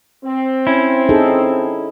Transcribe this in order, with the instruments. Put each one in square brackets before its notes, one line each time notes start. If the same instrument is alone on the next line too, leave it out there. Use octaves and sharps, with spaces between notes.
[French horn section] C4
[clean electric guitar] C#4 E4
[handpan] D#4 G#4 A4